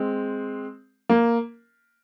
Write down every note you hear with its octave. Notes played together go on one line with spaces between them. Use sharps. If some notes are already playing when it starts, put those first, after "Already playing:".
Already playing: G#3 C4
A#3